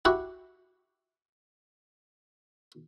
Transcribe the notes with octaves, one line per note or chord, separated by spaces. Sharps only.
E4 F#4 G4 F#5